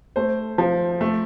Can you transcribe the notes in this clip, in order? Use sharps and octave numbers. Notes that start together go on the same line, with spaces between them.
A3 C5
F3
A3